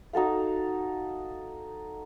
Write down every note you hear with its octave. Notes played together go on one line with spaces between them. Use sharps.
D#4 F#4 A4 F5